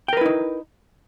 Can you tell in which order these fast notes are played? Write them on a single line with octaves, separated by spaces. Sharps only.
G5 A#4 B4 E4 D#4